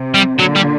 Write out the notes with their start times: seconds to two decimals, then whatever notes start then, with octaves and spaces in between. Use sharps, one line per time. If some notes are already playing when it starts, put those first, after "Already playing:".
Already playing: C3
0.14 G3
0.39 A#2 D3 F#3
0.55 G3